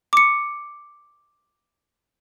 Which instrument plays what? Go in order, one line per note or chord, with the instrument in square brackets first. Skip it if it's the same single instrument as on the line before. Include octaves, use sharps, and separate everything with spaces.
[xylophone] D6 C#7